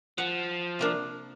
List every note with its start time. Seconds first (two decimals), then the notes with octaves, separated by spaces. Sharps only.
0.18 F3 F#5
0.79 C3 A#3 D4